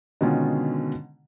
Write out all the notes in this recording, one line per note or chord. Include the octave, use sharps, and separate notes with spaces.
B2 D3 D#3 G#3 C#4 F4